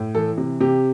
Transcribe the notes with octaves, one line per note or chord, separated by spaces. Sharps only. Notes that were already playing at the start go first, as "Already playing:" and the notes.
Already playing: A2
E3 A4
C3
C3 G4